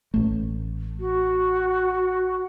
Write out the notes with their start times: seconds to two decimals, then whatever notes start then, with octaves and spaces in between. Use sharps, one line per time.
0.14 A1 A3
1.00 F#4